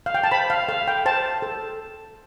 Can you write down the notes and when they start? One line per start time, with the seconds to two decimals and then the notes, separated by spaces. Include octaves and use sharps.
0.06 F5
0.14 G5
0.24 A5
0.32 C5 B5
0.50 F5
0.69 A4 F5
0.88 G5
1.06 C5 A5
1.42 A4